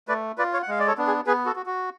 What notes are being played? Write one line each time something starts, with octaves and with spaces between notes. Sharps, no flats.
A3 B4 D5
F4 B4 D5
C#5 F5
F#5
G#3 F5
D5
A4 C#5
B3 D4
G#4
B3 G#4 B4
F#4 A4
F#4
F#4